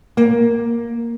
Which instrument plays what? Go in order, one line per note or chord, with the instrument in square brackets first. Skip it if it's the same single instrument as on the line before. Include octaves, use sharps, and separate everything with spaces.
[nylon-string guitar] A#3